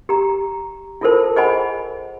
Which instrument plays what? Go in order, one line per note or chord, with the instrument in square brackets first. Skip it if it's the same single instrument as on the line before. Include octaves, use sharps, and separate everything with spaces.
[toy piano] G4 A#5
E4 F4 A4 A#4 C5 A5
G#4 C5 D#5 F#5 G#5 B5